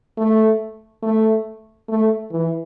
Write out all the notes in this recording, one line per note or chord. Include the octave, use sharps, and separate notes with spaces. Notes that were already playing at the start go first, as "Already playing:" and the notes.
A3
A3
A3
E3